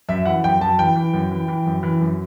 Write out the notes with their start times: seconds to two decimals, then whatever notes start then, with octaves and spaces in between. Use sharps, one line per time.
0.09 F#2 E5
0.26 E3 F#5
0.44 F#2 G5
0.61 F#2 A5
0.79 E3 G5
0.96 E3
1.14 F#2
1.31 E3
1.48 E3
1.66 F#2
1.83 E3
2.01 F#2